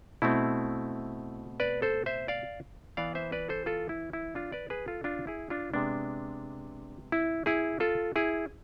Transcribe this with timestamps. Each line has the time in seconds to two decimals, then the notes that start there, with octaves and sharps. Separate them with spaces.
0.22 B2 A3 C4 E4
1.60 B4 D5
1.82 A4 C5
2.06 C5 E5
2.28 D5 F5
2.97 E3 B3 D5 F5
3.15 C5 E5
3.32 B4 D5
3.49 A4 C5
3.66 F4 A4
3.89 E4
4.13 E4
4.35 D4 F4
4.52 B4 D5
4.70 G#4 B4
4.88 F4 A4
5.04 D4 F4
5.27 E4 G#4
5.50 D4 F4
5.74 C3 G#3 B3 D4
7.12 E4
7.46 E4 G#4
7.80 F4 A4
8.16 E4 G#4